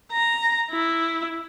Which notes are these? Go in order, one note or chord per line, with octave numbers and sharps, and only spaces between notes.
A#5
E4